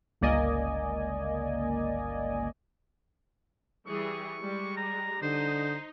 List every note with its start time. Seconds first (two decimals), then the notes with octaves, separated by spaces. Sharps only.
0.21 G1 C#2 A#3 D5 D#5 G#5
3.87 E3 G3 G#4 C#6
4.40 G3 G#3
4.77 A#5
5.22 D3 D#4 C5